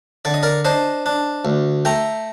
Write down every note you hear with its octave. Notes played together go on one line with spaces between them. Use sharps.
D3 D5
D#5
A#4 D5
D4 C5 D#5
D4
D2
A3 G5 A#5